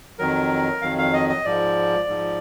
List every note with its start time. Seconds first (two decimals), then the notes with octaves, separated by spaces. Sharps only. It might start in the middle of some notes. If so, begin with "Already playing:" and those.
0.19 F2 D#3 F#3 A#4
0.82 F2 D#3 F#3 F5
0.98 F5
1.13 D#5
1.29 D#5
1.45 G#2 F3 D5
2.08 G#2 F3